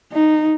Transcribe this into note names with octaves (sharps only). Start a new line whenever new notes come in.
D#4